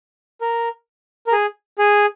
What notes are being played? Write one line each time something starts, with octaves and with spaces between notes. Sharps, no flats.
A#4
A#4
G#4
G#4